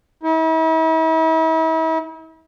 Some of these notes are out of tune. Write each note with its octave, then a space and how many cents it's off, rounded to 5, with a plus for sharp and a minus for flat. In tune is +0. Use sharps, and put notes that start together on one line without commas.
E4 -45